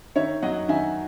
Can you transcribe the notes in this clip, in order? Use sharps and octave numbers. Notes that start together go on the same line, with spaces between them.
D#3 C#5 E5
F#3 D#5 F#5
D#3 E5 G#5